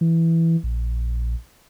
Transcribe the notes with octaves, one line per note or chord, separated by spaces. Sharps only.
E3
A#1